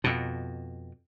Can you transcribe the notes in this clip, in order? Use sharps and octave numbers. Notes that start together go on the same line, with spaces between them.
F2 B2